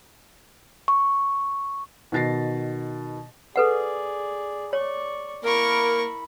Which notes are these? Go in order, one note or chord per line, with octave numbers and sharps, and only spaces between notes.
C#6
B2 D#3 A6 A#6 C7
G#4 A4 B4 D5 F#5
C#5 D5 C#6
A#3 E4 A#4 B5 C#6